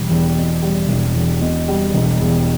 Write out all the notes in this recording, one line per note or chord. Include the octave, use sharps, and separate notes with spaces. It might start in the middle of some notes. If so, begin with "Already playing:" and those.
Already playing: E1 G3
E2
B2
G3
E1
E2
B2
G3
E1
E2